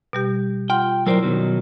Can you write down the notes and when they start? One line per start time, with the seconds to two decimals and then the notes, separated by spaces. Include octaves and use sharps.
0.13 B2 G3 G4
0.70 F4 F#5 G5 C6
1.06 F#3 E4 A#4 C5 D5 C6
1.23 B2 D#3 F#3